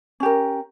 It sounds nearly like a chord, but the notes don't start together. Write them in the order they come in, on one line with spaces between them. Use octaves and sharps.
C#4 G4 A#4